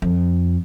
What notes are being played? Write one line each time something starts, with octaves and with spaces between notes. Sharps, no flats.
F2